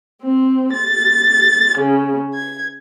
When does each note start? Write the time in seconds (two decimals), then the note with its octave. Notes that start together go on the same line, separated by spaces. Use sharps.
0.22 C4
0.73 A6
1.79 C#3
2.33 G#6